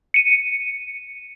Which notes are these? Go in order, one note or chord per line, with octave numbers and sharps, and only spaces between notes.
C#7 D#7